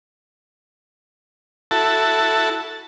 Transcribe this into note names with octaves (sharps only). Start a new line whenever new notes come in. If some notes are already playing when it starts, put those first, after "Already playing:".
E4 F#4 A4 A5